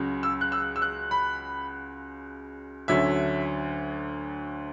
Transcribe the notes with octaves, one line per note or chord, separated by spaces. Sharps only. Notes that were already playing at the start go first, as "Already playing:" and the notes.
Already playing: C#2 C#3 F#3
E6
F#6
E6
E6
F#6
B5
D2 D3 F#3 C#4 E5